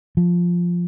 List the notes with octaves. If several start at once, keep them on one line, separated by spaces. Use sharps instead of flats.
F3